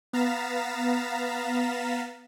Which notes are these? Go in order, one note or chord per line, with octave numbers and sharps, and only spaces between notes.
B3 F5 A#5 A6 B6 E7